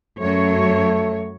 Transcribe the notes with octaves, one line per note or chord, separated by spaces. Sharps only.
F#2 F#3 A3 C#5